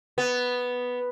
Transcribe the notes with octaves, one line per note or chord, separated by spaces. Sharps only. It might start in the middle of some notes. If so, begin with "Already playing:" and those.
B3